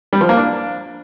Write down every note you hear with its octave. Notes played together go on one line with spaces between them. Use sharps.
G3
F3
A#3
D4